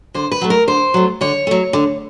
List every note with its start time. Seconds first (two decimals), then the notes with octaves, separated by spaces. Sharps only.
0.14 D3 C5
0.32 B4
0.41 F#3 A3
0.50 A#4
0.67 D3 C5
0.94 F#3 A3
1.21 D3 C#5
1.47 F#3 A3
1.73 D3